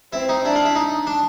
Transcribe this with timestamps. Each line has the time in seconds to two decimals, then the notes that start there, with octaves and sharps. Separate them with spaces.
0.13 C4 E4
0.29 D#4
0.44 D4 E4
0.55 F4
0.65 E4
0.75 D#4
1.07 D4